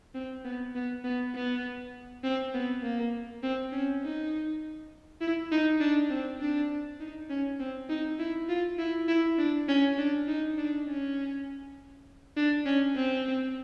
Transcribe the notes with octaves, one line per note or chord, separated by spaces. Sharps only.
C4
B3
B3
B3
B3
C4
B3
A#3
C4
C#4
D#4
E4
D#4
D4
C4
D4
D#4
C#4
C4
D#4
E4
F4
E4
E4
D4
C#4
D4
D#4
D4
C#4
D4
C#4
C4